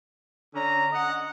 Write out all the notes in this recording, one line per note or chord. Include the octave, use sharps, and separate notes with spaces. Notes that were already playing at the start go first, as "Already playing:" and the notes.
D3 C#4 A#5
D#5 F#5